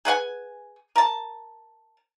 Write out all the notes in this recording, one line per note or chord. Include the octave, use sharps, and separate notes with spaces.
G#4 B4 F#5 G#5
A#4 A5